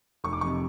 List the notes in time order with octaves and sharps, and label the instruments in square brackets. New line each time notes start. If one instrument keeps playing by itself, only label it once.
[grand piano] F1 C#6
D6
F2 C3 C#6